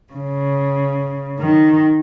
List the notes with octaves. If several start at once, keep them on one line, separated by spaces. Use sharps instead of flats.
C#3
D#3